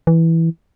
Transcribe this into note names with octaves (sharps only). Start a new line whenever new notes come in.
E3